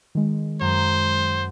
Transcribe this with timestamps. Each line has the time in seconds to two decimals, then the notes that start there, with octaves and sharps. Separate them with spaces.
0.15 D#3 G#3
0.61 F#2 C5 A#5